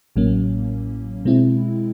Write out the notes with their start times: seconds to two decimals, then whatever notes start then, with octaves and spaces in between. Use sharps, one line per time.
0.16 A1 A2 F#3 A#3 C#4
1.25 B2 G#3 C4 E4